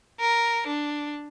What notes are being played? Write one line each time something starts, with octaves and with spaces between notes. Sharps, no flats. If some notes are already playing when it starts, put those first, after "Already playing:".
A#4
D4